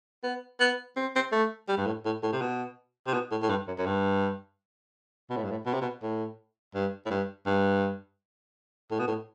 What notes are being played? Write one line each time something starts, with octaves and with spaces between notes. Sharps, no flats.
B3
B3
C4
C4
A3
G3
G2
A2
A2
A2
C3
B2
C3
B2
A2
A2
G2
F#2
F#2
G2
B2
A2
G2
A2
B2
C3
B2
A2
G2
A2
G2
G2
A2
B2
A2